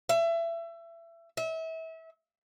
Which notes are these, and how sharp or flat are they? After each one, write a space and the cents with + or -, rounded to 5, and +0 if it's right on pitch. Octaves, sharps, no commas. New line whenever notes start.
E5 +25
E5 -30